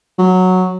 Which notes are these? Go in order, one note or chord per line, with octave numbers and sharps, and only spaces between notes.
F#3